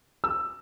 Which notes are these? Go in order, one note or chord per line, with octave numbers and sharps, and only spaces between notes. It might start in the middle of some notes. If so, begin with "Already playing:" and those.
E6